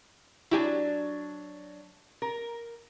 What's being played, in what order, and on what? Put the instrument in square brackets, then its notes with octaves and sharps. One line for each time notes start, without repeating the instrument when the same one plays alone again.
[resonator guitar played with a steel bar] F#3 D4 [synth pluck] E4 G4 G#5
[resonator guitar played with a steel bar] A#4